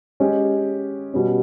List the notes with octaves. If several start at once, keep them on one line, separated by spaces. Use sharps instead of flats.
G#3 C#4 G4
B2 G3 C#4